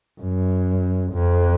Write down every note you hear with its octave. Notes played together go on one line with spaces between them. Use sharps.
F#2
F2